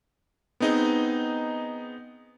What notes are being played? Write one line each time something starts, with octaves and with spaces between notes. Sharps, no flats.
B3 C4 D#4 G#4 D#5